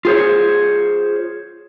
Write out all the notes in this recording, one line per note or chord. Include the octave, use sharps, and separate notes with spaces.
F4 G#4 C5 C#5